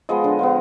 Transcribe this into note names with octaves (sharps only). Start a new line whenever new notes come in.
F3 G#3 B3 D#5
D3
F3 G#3 B3